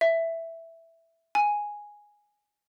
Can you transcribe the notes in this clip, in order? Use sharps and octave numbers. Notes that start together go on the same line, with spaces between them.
E5
G#5